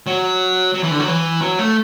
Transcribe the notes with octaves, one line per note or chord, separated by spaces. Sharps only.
F#3
F#3
E3
D3
F#3
E3
F#3
A3